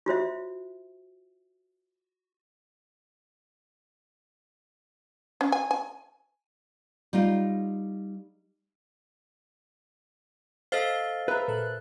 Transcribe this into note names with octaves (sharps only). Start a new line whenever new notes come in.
F4 F#4 C5 E5
C#4
G#5
G#5
G3 D#4 F4
A4 C5 D#5 F5 F6 A6
G#4 A#4 B4 E5 A#5
A#2 A4 F#6